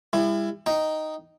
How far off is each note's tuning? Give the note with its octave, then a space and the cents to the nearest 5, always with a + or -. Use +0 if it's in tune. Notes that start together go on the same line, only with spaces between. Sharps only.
G3 +45 E4 +20
D#4 +0 G5 -10